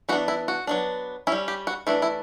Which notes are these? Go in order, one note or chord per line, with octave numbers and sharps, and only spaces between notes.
E3 B3 D4 F#4
E4
F#4
F#3 B3 D4
C#4 E4
G3
G4
F#4
E3 A3 D4 E4
E4